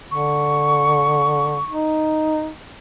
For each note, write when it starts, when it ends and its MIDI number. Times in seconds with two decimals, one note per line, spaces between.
0.11 1.60 50
0.11 1.72 85
1.70 2.47 63